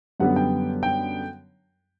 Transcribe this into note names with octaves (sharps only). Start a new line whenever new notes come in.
F#2 D3 G3 B3 F#5
G5
G5